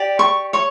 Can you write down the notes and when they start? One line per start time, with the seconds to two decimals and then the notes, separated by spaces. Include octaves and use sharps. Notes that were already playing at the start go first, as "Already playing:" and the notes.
Already playing: G4 D5
0.19 C#6
0.53 C#5 C#6